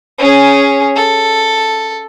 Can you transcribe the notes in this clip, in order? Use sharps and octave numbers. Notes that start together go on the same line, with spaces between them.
C#4 G#4
A4